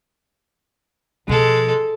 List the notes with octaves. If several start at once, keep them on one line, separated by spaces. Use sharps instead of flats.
B2 F3 G#3 A4